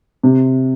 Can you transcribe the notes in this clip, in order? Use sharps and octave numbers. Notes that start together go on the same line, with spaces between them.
C3